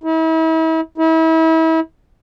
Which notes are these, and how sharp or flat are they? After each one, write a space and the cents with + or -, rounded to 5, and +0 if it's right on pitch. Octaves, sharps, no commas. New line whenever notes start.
E4 -40
E4 -35